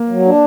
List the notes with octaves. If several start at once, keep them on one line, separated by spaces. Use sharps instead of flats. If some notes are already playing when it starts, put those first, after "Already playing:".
Already playing: A#3
F#3
D4